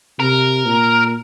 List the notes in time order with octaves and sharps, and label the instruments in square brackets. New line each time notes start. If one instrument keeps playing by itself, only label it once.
[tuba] C3 [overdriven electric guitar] A#4
[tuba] A#2